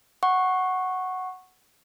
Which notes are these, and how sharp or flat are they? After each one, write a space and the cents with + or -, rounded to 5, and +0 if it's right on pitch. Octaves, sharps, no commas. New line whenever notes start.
F#5 +0 C#6 -10